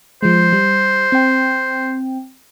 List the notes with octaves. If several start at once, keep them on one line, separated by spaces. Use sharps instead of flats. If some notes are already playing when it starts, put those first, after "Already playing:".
F3 G#3 C5
G3
C4 G5